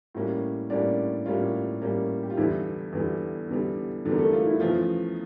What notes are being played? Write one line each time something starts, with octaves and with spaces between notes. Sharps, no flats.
A2 G3 A#3 C#4
A2 G3 A#3 C#4 D4 D5
A2 G3 A#3 C#4 F4
A2 G3 A#3 C#4
G4
F4
E2 D3 G3 E4
E2 D3 G3
E2 D3 G3
E2 D3 G3
A#4
A3 A4
F4
E4
E2 C#3 F3 A3 F4